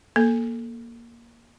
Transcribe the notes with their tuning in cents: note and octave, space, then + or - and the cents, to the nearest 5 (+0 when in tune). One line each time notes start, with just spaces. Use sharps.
A#3 +10 A4 +0